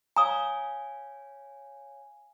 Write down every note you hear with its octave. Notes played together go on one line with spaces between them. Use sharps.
C#5 F5 G#5 A#5 D#6